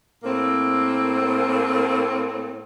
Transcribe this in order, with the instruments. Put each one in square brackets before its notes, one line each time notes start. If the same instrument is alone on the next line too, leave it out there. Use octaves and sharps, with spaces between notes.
[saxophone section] A2 A#3 C4